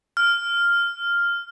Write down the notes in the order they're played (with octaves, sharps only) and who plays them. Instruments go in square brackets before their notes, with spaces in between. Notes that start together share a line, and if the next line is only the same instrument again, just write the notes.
[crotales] F6